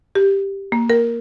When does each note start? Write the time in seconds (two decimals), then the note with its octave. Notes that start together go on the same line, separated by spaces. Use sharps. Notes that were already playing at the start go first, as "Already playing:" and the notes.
0.15 G4
0.72 A#3
0.90 A#4